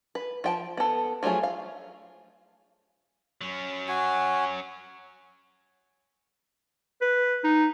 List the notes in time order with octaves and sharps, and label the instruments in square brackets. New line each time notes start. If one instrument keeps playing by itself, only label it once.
[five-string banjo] B4
F3 G5 A5
B3 A4
F3 F#3 A3 F4 G#4
F5
[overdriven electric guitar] F#3 C#4
[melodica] F#4 G#5
[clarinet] B4
D#4